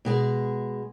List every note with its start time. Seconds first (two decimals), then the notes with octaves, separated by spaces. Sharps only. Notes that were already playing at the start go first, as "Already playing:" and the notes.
0.05 B2 G#3 G#4